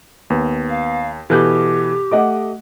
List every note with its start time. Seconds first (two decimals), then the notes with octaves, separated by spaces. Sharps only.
0.30 D#2 B3
0.69 F5
1.30 B2 E3 G4 A4 F#6 G6
2.11 A3 D#5 F#5 D6